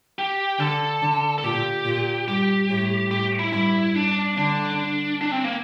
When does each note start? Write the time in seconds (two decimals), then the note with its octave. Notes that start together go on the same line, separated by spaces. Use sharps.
0.19 G4
0.59 D3 A4
1.02 D3
1.38 A4
1.44 A#2 G4
1.85 A#2
2.28 G2 G4
2.70 A2
3.11 A2 G4
3.39 E4
3.52 G2 E4
3.95 D4
4.37 D3 D4
5.21 D4
5.32 C4
5.44 A#3